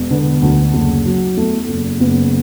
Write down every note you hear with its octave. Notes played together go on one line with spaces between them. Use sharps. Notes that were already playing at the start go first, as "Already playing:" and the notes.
Already playing: E1
D3 B3
D2
F#1
F#3
E2 A3
F#1
F#1 B3